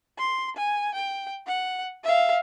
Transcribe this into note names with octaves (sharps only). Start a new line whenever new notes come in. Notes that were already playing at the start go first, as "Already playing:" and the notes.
C6
G#5
G5
F#5
E5 F5